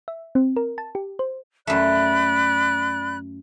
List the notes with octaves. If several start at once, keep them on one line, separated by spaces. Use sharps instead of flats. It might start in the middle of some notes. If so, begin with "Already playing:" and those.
E5
C4
A#4
A5
G4
C5
F#2 A3 D5 B5 F#6